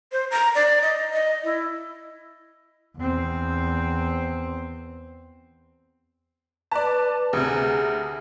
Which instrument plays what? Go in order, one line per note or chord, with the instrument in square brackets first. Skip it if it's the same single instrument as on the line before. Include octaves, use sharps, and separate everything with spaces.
[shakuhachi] C5
A#5
D5
D#5
D#5
E4
[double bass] E2 C4
[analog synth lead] B4 [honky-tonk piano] D5 A5
[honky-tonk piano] D2 C3 [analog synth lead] G#4